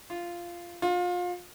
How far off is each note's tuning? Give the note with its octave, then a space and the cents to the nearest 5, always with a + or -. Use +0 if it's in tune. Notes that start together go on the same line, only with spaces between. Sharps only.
F4 -10
F4 +30